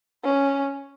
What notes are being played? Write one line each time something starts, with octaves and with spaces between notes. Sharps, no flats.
C#4